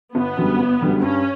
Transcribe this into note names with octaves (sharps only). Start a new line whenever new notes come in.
G1 B3
F#2 D3 G3
G1
F#2 D3 G3
G2 C#4